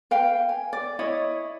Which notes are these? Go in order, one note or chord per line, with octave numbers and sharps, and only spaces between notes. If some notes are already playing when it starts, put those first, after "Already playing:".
B4 F5 G5
G#5
D5
E4 C#5 D#5